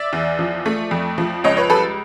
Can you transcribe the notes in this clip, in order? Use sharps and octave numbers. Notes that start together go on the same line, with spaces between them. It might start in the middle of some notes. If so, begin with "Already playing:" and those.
Already playing: D5 E5
E2
F3
A3
F2
F3
C#2 C#5 D#5
B4 C#5
G3 A4 B4